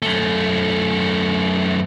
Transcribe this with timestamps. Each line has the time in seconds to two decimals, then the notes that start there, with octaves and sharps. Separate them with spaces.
0.02 F#2 A3